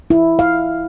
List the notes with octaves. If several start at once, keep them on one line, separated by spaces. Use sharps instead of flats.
E4
F5